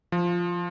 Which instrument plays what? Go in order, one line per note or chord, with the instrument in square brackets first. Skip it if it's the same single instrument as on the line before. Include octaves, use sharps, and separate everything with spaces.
[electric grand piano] F3